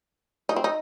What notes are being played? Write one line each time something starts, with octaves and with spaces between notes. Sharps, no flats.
D#4
C4
D#4